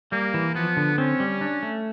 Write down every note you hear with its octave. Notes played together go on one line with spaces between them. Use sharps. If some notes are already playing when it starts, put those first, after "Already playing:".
G3 A#3
E3
F3 B3
D3
C4 C#4
G3
D4
A3